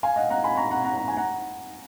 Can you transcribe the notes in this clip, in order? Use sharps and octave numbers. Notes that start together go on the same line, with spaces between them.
F5 G#5
D#5 F#5
F#5 A#5
G#5 B5
A#5 C#6
F#5 A#5
F#5 A#5
A#5
G#5
F#5 A#5